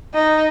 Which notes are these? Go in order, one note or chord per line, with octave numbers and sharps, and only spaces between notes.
D#4